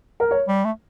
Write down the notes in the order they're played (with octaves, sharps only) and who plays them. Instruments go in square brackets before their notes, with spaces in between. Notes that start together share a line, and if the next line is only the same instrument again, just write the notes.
[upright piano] A#4
C#5
[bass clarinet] G3
A3